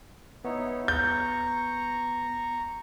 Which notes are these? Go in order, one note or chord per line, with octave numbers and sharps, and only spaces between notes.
B3 D#4 E4 C#5
A#5 C#6 G6